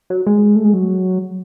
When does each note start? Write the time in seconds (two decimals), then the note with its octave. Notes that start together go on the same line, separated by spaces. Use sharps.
0.10 F#3
0.27 G#3
0.56 A3
0.64 G#3
0.74 F#3